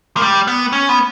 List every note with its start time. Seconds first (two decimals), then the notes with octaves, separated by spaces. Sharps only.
0.17 A#3
0.22 G3
0.48 B3
0.73 C#4
0.89 B3